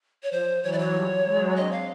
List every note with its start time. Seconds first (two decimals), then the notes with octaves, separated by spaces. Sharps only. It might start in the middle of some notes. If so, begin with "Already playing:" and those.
0.23 C#5
0.31 F3 C5
0.63 E3 F#3 C#5
0.72 D5
0.79 C#5
0.94 F3 G3
1.25 F#3 G#3
1.56 C4 D4 D#5
1.71 F5